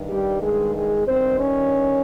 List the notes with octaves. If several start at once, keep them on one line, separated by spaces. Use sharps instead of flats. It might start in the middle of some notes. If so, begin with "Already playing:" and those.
Already playing: G2 D#3
G3 G4
G#3 G#4
G#3 G#4
G2 D#3 C4 C5
C#4 C#5